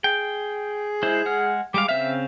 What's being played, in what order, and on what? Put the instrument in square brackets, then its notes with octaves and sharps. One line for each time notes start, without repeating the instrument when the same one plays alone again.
[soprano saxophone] G#4 [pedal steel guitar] G5
[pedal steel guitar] G#3 E4 C5
G#3 F#5 F6
[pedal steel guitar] G3 G#3 F5 [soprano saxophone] D6
[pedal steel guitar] C#3 C4 F5 [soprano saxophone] E5